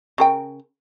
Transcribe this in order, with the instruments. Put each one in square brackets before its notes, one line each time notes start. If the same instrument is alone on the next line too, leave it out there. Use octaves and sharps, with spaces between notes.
[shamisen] C#3 A#4 G5